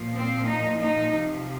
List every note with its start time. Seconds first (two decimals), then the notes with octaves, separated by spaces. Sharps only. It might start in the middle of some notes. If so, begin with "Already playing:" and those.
Already playing: A#2 F3
0.15 C4
0.47 D#4
0.79 D#4
1.10 C3 F3